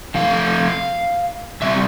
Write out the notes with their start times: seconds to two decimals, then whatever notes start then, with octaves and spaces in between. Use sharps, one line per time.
0.14 C3 F3 A3 C4 F5
1.62 C3 G3 C4 E5